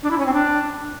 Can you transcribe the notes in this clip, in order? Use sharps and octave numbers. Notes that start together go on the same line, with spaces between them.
D4
E4
C#4
C4
D4